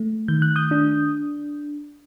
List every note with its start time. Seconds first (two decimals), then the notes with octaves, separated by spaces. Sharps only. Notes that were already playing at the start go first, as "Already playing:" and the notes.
Already playing: A3
0.28 D#3 G6
0.42 F#6
0.56 D#6 G6
0.71 D4